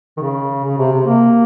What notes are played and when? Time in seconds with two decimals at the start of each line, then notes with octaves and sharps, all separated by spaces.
0.17 D#3
0.21 C#3
0.64 C#3
0.78 C3
0.92 C3
1.06 A#3